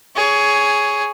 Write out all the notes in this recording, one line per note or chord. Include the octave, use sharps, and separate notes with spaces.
G#4 C#5